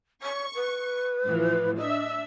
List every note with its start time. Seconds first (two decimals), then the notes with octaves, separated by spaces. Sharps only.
0.22 C#5 C#6
0.55 B4
1.26 A2 E3 F3
1.77 D4 D#5 E5